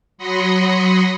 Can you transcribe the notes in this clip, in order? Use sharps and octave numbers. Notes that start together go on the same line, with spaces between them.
F#3 B5 C6 D#6 A#6 C#7